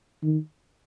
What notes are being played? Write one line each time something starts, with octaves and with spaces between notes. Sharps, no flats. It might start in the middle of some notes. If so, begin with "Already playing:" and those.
D#3